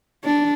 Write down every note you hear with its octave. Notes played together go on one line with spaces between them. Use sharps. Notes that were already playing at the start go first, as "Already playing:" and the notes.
D4